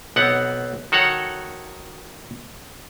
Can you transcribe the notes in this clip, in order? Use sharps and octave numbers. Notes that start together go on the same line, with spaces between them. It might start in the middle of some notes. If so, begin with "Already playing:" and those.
B1 B3 C4 F#5
D#3 F#4 A4 C#5 F#5